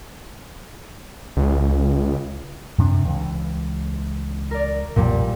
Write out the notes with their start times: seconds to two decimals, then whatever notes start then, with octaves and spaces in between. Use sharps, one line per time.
1.37 C#2
2.78 F#2 C3 D4
3.05 C#2 E3
4.51 A#4 D5
4.96 B1 F2 A#2 G3 A#3